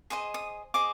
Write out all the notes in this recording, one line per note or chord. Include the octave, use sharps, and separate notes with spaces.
G#4 C5 D#5 D#6
D#6
G#4 C5 D#5 D6